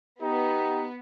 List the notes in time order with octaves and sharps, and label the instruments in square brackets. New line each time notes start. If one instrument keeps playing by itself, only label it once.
[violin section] B3 [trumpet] D#4 [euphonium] G4